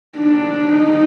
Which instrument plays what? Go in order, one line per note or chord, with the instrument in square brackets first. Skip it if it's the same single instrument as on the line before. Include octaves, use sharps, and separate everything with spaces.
[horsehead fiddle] D4
D#4